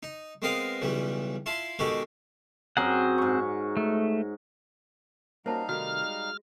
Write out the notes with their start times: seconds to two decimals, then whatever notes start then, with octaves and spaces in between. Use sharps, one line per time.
0.03 D#4
0.42 G#3 B3 C4 A#4 D#5 F5
0.82 B1 C#3 E3 G3
1.46 E4 F4 A5 C6
1.79 B2 D#3 G#3 F#4 G4 A4
2.77 F#2 C4 G#4 A#4 F#5
3.18 G#2 C#6
3.77 A3
5.46 G3 A#3 C#4 D#4 F#4 C5 F5 A5
5.69 C3 D#3 A3 F#4 F6
6.02 G#3